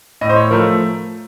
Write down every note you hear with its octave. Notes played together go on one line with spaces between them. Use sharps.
A2 D#5
C5
C#5
F3 A3 A#4